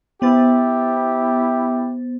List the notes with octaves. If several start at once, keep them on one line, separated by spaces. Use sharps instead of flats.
B3 E4 G4 C5 A6